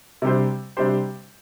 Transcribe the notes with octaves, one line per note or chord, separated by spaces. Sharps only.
C3 G3 D4 G4 C5
C3 G3 D4 G4 C5